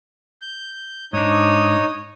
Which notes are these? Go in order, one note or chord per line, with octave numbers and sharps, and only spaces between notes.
G6
G#2 D4 D#4 C#5 D#6